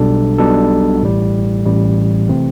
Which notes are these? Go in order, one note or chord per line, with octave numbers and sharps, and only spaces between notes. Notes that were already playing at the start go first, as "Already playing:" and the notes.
Already playing: B1 B2 G3 D4 A4
B1 B2 G3 D4 A4
A1 A2 G3
A1 A2 G3
C3 E3 A3 C4